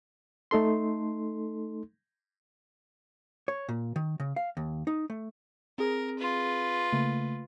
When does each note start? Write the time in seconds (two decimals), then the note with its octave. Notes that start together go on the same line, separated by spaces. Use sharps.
0.51 A3 D#4 A4 C6
3.48 C#5
3.69 A#2
3.96 D#3
4.20 C#3
4.36 F5
4.57 D#2
4.87 D#4
5.10 A3
5.78 C4 G#4 A#4
6.19 F4 B4
6.93 C#3 A3 A#3